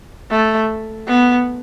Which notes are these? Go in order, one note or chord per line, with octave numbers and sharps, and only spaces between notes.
A3
B3